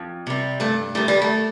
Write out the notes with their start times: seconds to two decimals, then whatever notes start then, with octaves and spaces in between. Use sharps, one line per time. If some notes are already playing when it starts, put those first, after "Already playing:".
Already playing: F2
0.27 C3 G3
0.60 G2 A3
0.95 D#3 G3 A3
1.08 G3
1.22 A3